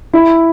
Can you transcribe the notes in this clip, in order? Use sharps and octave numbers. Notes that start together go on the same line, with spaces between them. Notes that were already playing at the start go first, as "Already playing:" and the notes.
E4